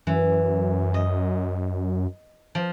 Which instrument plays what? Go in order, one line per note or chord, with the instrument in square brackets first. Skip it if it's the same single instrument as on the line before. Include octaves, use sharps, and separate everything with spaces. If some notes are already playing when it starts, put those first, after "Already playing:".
[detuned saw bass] F#2 [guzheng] E3
[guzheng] D#5
F3